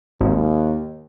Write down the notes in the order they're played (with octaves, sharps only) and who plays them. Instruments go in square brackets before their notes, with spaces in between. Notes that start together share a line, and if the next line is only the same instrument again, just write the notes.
[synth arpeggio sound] G#1 [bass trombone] D#2